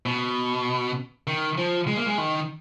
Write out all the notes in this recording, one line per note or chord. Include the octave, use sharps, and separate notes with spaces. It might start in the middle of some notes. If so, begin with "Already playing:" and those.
B2
D#3
F3
G#3
A#3
G#3
D#3